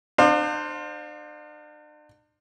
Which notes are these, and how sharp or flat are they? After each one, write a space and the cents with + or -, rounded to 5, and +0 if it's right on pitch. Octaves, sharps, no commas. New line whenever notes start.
D4 +40 C5 +0 F5 +30